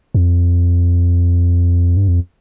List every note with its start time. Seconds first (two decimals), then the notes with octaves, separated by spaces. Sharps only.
0.15 F2
1.97 G2
2.08 F2